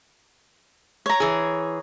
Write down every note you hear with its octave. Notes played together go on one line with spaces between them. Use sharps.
C#5 A#5
E3 G#4